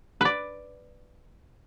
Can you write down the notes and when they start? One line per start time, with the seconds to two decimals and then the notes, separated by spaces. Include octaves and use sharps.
0.21 B4 D5